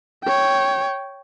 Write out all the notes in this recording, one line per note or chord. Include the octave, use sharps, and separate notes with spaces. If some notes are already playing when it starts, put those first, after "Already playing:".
C#5 G5